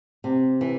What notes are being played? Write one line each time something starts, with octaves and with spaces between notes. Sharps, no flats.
C3
E3